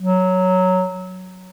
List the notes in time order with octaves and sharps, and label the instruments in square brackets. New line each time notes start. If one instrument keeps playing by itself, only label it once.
[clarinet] F#3